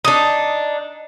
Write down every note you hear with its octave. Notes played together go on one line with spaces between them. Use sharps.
D4 D#4